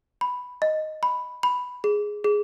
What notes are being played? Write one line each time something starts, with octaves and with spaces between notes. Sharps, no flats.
B5
D#5
B5
B5
G#4
G#4